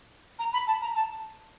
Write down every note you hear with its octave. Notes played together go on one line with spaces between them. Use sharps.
A#5
B5
A5
A#5
A5